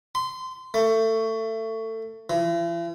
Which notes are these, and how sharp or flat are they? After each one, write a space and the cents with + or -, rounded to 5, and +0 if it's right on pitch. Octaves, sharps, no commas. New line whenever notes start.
C6 -20
A3 +25
E3 +45